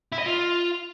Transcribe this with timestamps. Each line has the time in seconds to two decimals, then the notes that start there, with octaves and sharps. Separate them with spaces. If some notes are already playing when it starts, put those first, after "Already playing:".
0.12 E4
0.19 D#5
0.26 F4